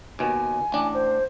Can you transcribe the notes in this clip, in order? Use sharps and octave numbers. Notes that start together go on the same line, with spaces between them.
D#2 B2 G#5
A1 D4
C5